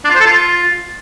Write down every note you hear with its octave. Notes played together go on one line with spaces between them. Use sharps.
D4
F4
C5
A4
F4